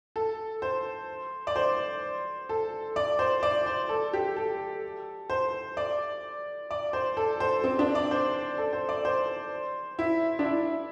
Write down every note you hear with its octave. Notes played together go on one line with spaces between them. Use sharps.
A4
C5
D5
C5
A4
D5
C5
D5
C5
A4
G4
A4
C5
D5
D5
C5
A4
C5
C4
D4
D5
C5
A4
C5
D5
C5
E4
D4
E4